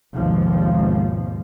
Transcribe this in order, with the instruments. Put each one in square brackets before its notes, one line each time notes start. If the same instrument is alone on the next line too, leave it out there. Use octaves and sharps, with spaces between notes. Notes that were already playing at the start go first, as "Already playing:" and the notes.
[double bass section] G#1 D#2 B2 F3